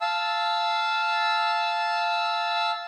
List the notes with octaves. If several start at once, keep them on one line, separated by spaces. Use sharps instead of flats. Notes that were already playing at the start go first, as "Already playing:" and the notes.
F5 A5 E6